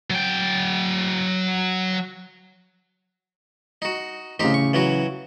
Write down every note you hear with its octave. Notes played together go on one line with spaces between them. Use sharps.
F#3 G5
D#4 F#4
A1 C#3 C4 D#4 G4
C#6
E3 F#3 F#4